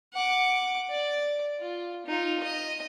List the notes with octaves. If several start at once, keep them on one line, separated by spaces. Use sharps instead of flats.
F#5 D6
D5
F4
D#4 F4
D#5